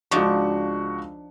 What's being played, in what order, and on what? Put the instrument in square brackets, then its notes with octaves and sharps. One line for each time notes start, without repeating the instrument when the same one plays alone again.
[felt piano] C#2 F#4 C#6 [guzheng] F3 D4 D#4